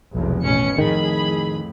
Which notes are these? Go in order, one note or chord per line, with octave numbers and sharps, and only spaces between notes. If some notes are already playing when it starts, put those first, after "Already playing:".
F1 B1 E2
A1 B2 D#3 C#4 C#7
F2 A2 D#3 G#4 B5